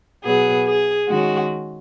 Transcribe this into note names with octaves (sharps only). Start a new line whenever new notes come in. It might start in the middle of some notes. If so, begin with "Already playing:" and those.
B2 F#3 B3 G#4
G#4
D#3 G#3 C#4 F#4